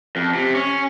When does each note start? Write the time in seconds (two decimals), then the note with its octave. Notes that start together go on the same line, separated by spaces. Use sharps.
0.16 F2
0.35 C3
0.54 C#4